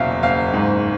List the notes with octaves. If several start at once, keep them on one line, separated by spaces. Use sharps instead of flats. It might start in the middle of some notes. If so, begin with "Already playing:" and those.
Already playing: F#1 E2 B2 E5 F5
F#1 F5
G#2